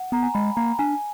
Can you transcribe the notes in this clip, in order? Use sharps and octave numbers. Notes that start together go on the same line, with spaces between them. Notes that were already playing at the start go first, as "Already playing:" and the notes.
Already playing: F#5
B3 A#5
G#5
G#3 B5
A#3 A#5
D4 G#5